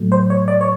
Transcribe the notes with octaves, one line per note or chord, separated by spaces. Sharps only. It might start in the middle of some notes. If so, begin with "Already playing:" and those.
Already playing: A2 F#3 A3
C5
C#5
D5
C#5